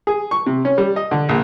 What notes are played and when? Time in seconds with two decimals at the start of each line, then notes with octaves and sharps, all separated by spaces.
0.07 G#4
0.31 C#6
0.46 C3
0.65 C#4
0.78 G3
0.96 D#5
1.11 D3
1.29 A#1